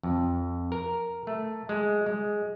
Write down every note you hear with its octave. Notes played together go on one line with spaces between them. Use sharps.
F2
A#4
A3
G#3
G#3